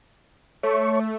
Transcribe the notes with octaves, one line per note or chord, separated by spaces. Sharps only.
A3 C#5 C#6